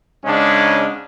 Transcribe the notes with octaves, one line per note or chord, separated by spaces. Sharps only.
G#2 C#3 G#3 C#4 D4